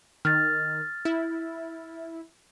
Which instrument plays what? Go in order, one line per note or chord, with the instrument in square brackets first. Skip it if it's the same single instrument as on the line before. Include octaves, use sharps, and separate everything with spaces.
[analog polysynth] D#3 [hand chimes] F6 A6
[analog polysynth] E4